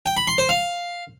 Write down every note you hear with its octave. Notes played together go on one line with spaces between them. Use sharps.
G5
B5
C6
C5
F5